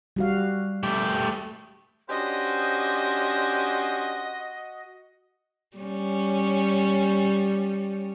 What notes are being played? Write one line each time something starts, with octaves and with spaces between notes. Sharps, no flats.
G3 F#4 F5
A3 G4
C#4 D4 F#4 G4 C5 D#5
G3 C#4